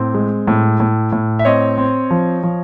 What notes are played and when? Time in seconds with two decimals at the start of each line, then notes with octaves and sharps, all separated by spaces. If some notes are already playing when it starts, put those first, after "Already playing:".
Already playing: A2 C4
0.14 G#3
0.47 A2
0.80 A2
1.12 A2
1.39 E5
1.45 C4 C#5 D#5
1.78 C4
2.11 F3
2.43 F3